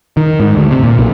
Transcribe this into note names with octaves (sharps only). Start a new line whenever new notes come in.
D#3
G#2
D2
C3
A#2
B1